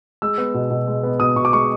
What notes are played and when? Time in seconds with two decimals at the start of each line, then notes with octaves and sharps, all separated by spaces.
0.22 G#3 E6
0.38 B3
0.54 B2
0.71 B2
0.88 G#3
1.03 B3
1.20 B2 D#6
1.36 B2 C#6
1.45 D6
1.53 G#3 C#6